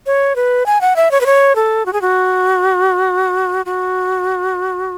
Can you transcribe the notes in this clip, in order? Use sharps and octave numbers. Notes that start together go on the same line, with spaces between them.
C#5
B4
G#5
F#5
E5
C#5
B4
C#5
A4
F#4
G#4
F#4
F#4